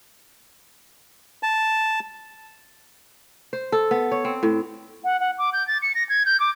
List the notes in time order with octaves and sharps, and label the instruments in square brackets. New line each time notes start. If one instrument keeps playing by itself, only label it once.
[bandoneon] A5
[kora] C5
A4
B3
C#5
C4
A2
[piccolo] F#5
F#5
D6
G6
A6
C#7
A#6
G#6
G6
D6